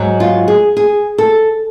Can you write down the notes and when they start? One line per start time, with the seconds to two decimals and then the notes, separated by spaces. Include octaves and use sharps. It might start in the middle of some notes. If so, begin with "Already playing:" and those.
Already playing: G#2 F#3
0.20 F4
0.48 G#4
0.77 G#4
1.18 A4